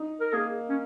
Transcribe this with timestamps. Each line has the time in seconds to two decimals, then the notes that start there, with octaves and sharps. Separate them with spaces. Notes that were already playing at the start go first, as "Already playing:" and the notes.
Already playing: D#4
0.21 A#4
0.33 A#3 G#4
0.69 C#4